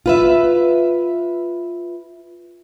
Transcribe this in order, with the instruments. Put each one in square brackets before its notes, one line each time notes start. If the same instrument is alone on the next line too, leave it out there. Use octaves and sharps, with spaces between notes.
[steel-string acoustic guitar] F4 B4 E5